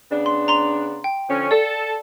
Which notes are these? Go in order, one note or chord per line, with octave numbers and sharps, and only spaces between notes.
C#3 B3 D4
C6
A#5 C6 F7
G5
D3 F3 C#4
A4 D5